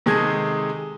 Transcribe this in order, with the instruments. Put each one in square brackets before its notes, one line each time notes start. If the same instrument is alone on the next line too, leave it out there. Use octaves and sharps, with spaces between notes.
[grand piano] C3 D#3 G#3 G#4 A4 G#6